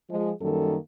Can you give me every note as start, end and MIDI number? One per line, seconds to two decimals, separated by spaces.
0.10 0.31 53
0.10 0.31 56
0.41 0.76 42
0.41 0.76 51
0.41 0.76 55
0.41 0.76 58
0.41 0.76 69